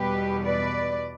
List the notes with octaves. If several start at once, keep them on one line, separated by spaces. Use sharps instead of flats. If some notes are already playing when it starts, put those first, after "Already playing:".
Already playing: E2 B2 G3 G4 B4
B4 D5